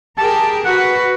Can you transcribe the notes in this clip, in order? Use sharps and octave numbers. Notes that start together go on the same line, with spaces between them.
G4 G#4 A#4 A5
F#4 B4 F#5